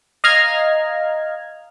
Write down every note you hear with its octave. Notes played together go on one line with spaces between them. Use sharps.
D#5 F5 A#5 F6 G#6